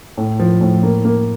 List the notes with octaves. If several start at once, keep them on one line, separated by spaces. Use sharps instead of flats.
A2
F3
A2
A#3
A#3